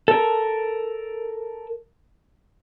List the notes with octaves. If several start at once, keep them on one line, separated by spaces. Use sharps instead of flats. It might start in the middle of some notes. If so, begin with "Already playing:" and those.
A4 A#4